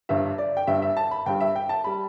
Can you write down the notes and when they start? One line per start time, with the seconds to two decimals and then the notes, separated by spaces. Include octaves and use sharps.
0.09 G1 G2 G3 E5
0.38 D5
0.57 G5
0.67 G1 G2 G3 E5
0.82 E5
0.97 A5
1.11 B5
1.26 G1 G2 G3 G5
1.40 E5
1.56 G5
1.69 A5
1.84 G3 B5